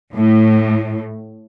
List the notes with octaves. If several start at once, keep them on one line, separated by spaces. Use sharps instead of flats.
A2